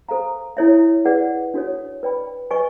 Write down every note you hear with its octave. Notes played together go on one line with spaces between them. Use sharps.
A4 C5 F5 A#5
E4 A4 C#5 E5
G#4 B4 D5 F#5
D4 F#4 A4 C#5
B4 D5 G5 B5
B4 D#5 G#5 C#6